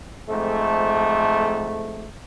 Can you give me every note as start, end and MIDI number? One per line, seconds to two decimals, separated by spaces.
0.29 2.08 41
0.29 2.08 44
0.29 2.08 57